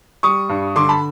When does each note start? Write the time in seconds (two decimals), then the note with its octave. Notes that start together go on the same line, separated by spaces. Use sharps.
0.23 G3 C#6 D#6
0.49 G2
0.76 D3 C6 D6
0.89 A5 B5